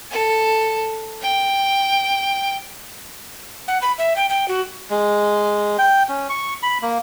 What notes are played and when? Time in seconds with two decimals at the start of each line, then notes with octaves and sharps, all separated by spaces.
0.11 A4
1.22 G5
3.68 F#5
3.82 B5
3.98 E5
4.16 G5
4.29 G5
4.48 F#4
4.90 G#3
5.79 G5
6.09 C#4
6.29 C#6
6.63 B5
6.82 A#3